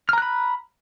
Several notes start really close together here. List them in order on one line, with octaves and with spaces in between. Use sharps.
F6 A#5 F#6 B5